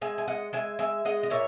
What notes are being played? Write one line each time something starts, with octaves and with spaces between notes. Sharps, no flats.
G#3 E5 G#5
G#5
G#3 D#5 F#5
G#3 E5 G#5
G#3 E5 G#5
G#3 D#5 F#5
D#5
A#2 C#5 E5